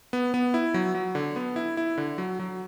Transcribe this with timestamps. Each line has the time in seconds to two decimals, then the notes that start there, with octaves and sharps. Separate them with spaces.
0.13 B3
0.34 B3
0.54 E4
0.74 F#3
0.95 F#3
1.15 D3
1.36 B3
1.56 E4
1.77 E4
1.98 D3
2.18 F#3
2.39 F#3